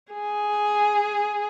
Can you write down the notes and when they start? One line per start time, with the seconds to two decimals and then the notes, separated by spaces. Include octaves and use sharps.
0.13 G#4